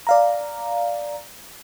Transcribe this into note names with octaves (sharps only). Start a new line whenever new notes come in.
D5 F5 A#5